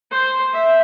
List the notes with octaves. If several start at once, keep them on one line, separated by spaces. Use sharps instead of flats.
C5
E5